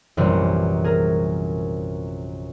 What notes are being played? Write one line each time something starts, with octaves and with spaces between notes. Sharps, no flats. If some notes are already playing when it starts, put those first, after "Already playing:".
A#1 F#2 C3 E3 G3
G#4 A#4